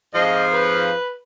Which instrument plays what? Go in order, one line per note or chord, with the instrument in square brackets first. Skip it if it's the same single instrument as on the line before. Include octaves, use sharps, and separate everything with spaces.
[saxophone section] F2 G#2 F3 [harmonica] D#5
[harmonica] B4